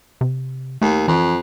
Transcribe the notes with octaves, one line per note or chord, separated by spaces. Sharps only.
C3
D#2 A3
F2 E3